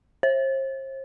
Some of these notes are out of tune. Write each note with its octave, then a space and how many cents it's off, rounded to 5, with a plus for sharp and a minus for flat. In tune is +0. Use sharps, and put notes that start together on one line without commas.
C5 +40